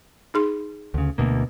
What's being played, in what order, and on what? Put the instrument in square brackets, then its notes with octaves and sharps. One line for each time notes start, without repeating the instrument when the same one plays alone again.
[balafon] D#4 G#4 C6
[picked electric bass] D2 C#3
D2 B2 A#3